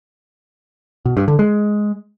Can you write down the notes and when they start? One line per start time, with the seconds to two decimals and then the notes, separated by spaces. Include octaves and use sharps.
1.05 B2
1.17 G2
1.28 D3
1.39 G#3